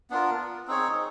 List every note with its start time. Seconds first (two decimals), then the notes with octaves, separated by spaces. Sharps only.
0.10 B3 D4 F4 A#4
0.68 C4 D#4 G#4 C#5